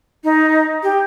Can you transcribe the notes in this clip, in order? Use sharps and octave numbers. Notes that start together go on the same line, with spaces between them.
D#4
G4